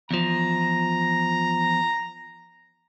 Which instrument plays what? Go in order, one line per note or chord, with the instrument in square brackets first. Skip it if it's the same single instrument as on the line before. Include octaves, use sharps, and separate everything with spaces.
[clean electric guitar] E2 F3 [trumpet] A#5